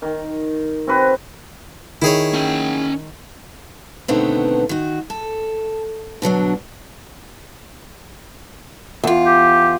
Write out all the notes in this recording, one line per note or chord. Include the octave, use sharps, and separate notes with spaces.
D#3
C4 F#4 B4
D#3 E4 G#4 C#5
C#4 G5
B2 D3 D#3 A3 B3 C4
D#3 F#4
A4
B2 D3 F#3 D4
E2 F4
G4